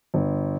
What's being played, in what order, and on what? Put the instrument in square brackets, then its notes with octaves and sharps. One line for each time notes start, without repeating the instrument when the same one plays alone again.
[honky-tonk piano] G1